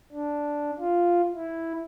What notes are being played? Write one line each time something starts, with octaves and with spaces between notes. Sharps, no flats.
D4
F4
E4